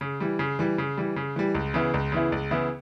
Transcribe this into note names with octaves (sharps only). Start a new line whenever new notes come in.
C#3
E3 G3
C#3
E3 G3
C#3
E3 G3
C#3
E3 G3
C#2
C#3 E3 B3 E4
C#2
C#3 E3 B3 E4
C#2
C#3 E3 B3 E4